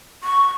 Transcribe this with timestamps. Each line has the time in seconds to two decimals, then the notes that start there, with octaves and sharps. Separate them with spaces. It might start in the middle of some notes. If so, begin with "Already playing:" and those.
0.23 C#6